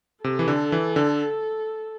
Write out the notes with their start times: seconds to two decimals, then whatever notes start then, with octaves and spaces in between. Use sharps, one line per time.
0.24 C3 A4
0.39 E3
0.48 D3
0.72 E3
0.96 D3